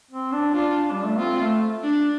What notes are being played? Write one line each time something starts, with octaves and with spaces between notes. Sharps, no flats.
C4
D4
D4 F4
G3
A3
C4 F4
A3
D4